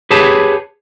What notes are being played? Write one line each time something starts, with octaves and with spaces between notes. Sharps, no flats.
G4 G#4 B4 C#5 A5